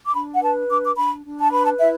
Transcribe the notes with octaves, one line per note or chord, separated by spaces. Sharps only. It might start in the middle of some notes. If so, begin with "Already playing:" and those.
D6
D4 B5
F#5
B4 A5
D4 D6
D6
D4 B5
D4
A5
B4 B5
A5
E4 E5